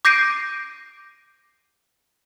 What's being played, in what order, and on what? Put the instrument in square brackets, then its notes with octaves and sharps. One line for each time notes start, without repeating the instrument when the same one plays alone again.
[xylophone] D6 G6 A#6 C7 D7 D#7